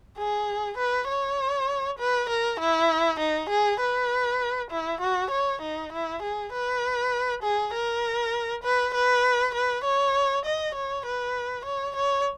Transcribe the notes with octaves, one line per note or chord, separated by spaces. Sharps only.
G#4
B4
C#5
B4
A#4
E4
D#4
G#4
B4
E4
F#4
C#5
D#4
E4
G#4
B4
G#4
A#4
B4
B4
B4
C#5
D#5
C#5
B4
C#5
C#5